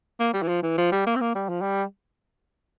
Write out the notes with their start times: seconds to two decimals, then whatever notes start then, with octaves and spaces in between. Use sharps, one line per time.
0.20 A#3
0.34 G3
0.42 E3
0.48 F3
0.62 E3
0.78 F3
0.92 G3
1.07 A#3
1.16 C4
1.20 A#3
1.35 G3
1.49 F3
1.62 G3